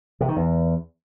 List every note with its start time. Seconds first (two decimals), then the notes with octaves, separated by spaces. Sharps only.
0.21 C3
0.28 D#3
0.36 E2